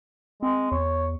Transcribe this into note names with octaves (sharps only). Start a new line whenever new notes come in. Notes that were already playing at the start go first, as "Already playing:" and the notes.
G#3 C4
E2 C#5